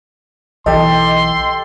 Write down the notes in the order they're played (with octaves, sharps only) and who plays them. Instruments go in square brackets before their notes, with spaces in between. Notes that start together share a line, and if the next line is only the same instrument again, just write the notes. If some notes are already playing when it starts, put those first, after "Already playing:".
[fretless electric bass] B1 E3 [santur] G4 A4 [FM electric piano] D#5 [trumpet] C6